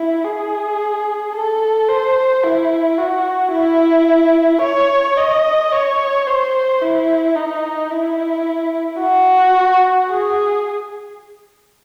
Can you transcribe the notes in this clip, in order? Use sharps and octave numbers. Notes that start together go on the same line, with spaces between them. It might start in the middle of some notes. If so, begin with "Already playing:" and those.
Already playing: E4
G#4
A4
C5
E4
F#4
E4
C#5
D#5
C#5
C5
E4
D#4
E4
F#4
G#4